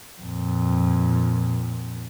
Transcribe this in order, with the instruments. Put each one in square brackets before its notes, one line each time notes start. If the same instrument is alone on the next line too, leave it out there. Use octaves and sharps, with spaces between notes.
[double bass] F2 A#2